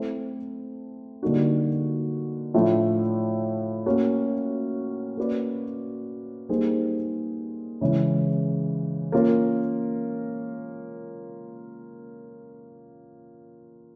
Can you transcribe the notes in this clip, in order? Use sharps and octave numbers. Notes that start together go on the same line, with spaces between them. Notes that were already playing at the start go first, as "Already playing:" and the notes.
Already playing: A3 C4 E4 A4 C5
D3 G3 A#3 D#4 F#4
A2 F3 A3 D4 F4
A#3 C#4 F#4
A#3 C#4 F#4 B4 D5
G3 A#3 D#4 G#4 C5
C#3 E3 G#3 C#4
A#3 C#4 F4 A#4